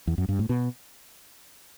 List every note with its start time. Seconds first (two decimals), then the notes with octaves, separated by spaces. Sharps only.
0.07 E2
0.18 F#2
0.29 G2
0.39 A2
0.49 B2